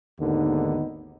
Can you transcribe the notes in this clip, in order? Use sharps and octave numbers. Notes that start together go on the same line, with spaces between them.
G#1 D#2 D3 B3 D#4